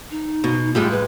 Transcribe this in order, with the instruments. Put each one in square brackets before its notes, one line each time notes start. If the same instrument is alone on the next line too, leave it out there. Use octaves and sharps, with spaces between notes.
[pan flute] D#4
[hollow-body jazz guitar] B2
[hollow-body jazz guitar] A2 G3 G#3 [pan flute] F4
[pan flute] B4